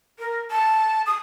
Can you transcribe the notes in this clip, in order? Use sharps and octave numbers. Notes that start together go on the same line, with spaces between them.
A#4
A5
D#6